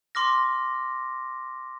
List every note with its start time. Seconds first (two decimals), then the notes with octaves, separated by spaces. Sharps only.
0.15 C6 D6 F6 A#6